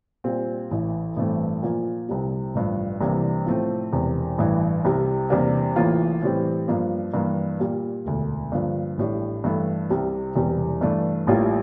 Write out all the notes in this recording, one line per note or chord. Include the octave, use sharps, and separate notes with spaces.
A#2 G3 C4
A1 A2 E3
A1 G2 E3 A3 C4
A#2 F3 A#3
C2 C3 G3
A1 G2 F3
C2 C3 E3 A#3 D4
A2 F3 A3 C4
E1 E2 C3
A1 G2 E3
C2 C3 G3
E2 C3 G3 A#3 D4
A1 A2 E3 A#3 F4
A2 E3 G3 C4
G2 F3 A#3
G2 E3 A#3
A#2 G3 A#3
E1 D2 D3
G2 D3 F3 A#3 D4
A1 A2 G3 D4
G2 E3 A3 E4 A4
C2 C3 G3
E1 E2 C3 G3
G2 E3 A3 D4
A1 A2 G3 A#3 F4